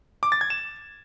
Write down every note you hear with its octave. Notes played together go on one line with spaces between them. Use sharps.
D6
A6
G#6
E7